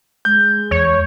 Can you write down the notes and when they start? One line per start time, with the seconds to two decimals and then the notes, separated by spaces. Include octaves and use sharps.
0.25 G#3 G6
0.71 E2 C#5